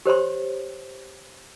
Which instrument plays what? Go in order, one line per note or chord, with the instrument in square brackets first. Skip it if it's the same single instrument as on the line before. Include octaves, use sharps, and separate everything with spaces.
[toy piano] G4 C5 C#5 C6